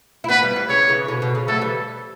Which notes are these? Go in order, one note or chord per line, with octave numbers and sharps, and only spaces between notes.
E4
B3 D4 B4
G3 B3
E3 G3
C#3 E3 C#5
C#3 E3
B2 D3
B2
C#3
F#3 A3 A4
E3 G3